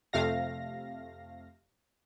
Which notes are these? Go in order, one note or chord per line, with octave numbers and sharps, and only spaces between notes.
F2 C3 A3 F5 A#6